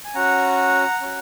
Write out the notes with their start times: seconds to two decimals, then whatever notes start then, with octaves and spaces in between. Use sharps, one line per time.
0.05 G#5
0.15 C#4 F#4 F#5 A#5
1.01 C#4 F#4